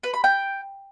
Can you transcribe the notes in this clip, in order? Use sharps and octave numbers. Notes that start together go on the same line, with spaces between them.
B4
B5
G5